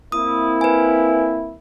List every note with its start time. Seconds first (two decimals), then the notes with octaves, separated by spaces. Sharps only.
0.12 A#3 C4 E4 D#6
0.61 B4 G#5